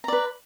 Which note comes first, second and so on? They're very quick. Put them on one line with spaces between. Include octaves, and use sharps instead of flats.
A#5 D5 B4